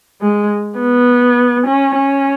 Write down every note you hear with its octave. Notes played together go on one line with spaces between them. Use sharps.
G#3
B3
C#4
C#4